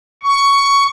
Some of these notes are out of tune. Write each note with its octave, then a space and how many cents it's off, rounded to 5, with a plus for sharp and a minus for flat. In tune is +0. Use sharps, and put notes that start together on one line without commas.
C#6 +10